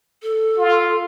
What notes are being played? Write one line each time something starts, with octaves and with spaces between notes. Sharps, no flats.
A4
F4